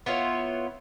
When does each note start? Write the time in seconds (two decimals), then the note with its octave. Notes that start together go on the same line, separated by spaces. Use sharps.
0.06 B3 E4 F4 C#5